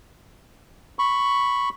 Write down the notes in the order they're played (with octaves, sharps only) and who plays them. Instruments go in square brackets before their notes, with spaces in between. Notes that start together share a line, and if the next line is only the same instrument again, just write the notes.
[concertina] B5 C#6